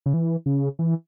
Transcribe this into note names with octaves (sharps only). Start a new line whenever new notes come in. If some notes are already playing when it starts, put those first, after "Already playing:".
C#3
E3
C#3
E3